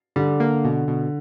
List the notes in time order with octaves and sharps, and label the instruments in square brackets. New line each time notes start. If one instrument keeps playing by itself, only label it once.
[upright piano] D3 [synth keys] G3
[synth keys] A#3
B2
B2